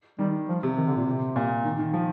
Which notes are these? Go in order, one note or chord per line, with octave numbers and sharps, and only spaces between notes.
D#3 G3
F3
C3
D#3
D3
A#2
C3
A#2
D#3
D#3
F3